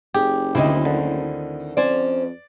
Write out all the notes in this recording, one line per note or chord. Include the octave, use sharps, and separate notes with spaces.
F#1 G4 G#4
D2 D#3 C4 E4 D#5
D3
F2 C#4 C5 D5 G#5